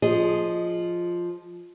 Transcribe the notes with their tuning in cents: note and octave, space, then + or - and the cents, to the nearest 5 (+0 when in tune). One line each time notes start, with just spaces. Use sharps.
F3 +0 G#4 +0 D#5 -5